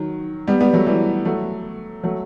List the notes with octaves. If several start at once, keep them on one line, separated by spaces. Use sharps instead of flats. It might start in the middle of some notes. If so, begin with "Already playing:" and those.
Already playing: D#3 F#3
G3 B3
G3 B3
F#3 A3
E3 G3
F#3 A3
F#3 A3